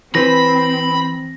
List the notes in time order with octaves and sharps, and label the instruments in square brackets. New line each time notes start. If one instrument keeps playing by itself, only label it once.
[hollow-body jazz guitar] E3 B4 C5 [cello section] C4 [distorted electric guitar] B5 [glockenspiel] A#6